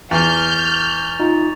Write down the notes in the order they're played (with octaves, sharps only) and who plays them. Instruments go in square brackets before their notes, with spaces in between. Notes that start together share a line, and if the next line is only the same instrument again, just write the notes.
[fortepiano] E2 [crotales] C#6 A6 F7 [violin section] F6 G6
[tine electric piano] D#4 F4